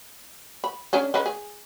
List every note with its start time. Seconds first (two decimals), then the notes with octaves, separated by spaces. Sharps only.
0.64 B5
0.93 C#4 D4 G#4
1.14 G#3 C#4 B4
1.26 G#4